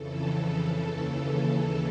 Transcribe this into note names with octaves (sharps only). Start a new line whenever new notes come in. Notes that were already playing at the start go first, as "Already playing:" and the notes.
Already playing: F2 C#3 E3 A4
D#2 C#3 E3